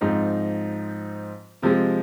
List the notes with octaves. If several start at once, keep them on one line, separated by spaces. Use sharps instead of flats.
G#2 F3 C4 D#4
C3 F3 G#3